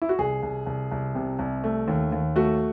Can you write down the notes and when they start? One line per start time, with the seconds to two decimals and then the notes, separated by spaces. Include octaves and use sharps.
0.02 E4
0.09 F#4
0.18 C2 G#4
0.43 C2
0.66 C2
0.92 C2
1.15 C3
1.39 C2
1.64 A3
1.88 D#2
2.12 D#2
2.36 A3 F#4